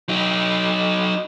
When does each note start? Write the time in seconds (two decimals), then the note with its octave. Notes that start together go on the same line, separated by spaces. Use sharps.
0.09 F#3 D#4